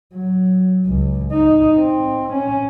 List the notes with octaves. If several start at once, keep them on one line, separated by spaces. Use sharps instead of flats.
F#3
C#2
D#4
C4
C#4